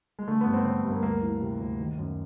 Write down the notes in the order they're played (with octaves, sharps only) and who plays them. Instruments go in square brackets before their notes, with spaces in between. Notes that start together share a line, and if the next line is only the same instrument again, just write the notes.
[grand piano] G#3
D3 A3
B3
G2
C4
D3 C4
G2
A#3
D2 A#3
E3
C3
D2
D#3
F#2